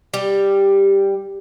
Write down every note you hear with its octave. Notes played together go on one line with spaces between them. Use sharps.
G3 G4